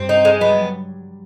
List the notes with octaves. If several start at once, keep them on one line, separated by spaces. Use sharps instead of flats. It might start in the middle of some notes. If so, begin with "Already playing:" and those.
Already playing: G2 G3 C4
D#4
G#3
F#3 B3
G3